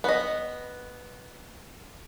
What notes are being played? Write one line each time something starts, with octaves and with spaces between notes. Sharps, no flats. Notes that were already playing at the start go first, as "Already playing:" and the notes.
B3 D#5